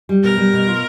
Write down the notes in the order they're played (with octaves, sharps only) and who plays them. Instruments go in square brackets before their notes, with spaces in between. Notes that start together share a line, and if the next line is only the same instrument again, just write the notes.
[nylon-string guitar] G3
[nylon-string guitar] B2 [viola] A#4
[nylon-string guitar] G3
B2
F4